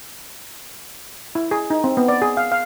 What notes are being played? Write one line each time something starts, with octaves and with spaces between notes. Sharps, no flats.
E4
G#4
D#4
C4
B3
D5
G#4
F5
F5